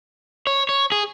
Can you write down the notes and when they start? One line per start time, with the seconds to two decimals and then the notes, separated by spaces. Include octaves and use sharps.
0.47 C#5
0.69 C#5
0.92 G#4